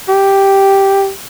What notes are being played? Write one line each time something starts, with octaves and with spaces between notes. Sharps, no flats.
G4